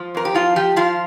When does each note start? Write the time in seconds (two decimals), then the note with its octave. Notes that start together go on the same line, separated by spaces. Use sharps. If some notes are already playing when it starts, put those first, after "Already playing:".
Already playing: F3
0.15 F2 A#4
0.25 G4
0.35 F3 F4
0.56 F3 G4
0.76 F3 F4